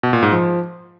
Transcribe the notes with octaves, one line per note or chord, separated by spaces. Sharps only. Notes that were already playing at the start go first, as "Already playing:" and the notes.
B2
A#2
G#2
F3